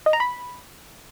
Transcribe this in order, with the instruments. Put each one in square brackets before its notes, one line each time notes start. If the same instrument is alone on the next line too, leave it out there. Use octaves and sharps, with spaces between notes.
[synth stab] D#5
A#5
B5